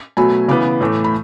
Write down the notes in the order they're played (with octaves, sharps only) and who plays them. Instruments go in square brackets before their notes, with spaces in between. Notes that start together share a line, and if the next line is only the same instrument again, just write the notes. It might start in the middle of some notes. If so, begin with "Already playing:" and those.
[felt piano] B2 F#3 A3 G#5 B5
C#3 E3 B3 B5 D6
A2 E3 A3
B5